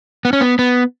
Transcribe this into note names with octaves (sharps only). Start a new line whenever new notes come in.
B3
C#4
B3
B3